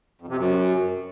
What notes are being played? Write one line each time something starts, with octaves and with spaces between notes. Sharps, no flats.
F2
C3
F#2